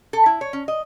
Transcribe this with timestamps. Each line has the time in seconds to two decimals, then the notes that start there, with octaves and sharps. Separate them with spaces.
0.13 A4
0.26 E4
0.41 C#5
0.53 C#4
0.68 D#5